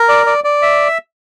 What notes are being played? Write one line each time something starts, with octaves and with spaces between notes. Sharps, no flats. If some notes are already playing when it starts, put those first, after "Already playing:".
Already playing: A#4
D5
D5
D5
E5